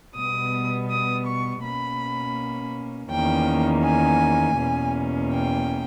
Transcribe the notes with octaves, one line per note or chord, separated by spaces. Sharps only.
B2 G3 B3 D#6
D#6
C#6
B2 A#3 C#4 B5
E2 D#3 A#3 C#4 G5
G#5
E2 B2 A#3 C#4
G5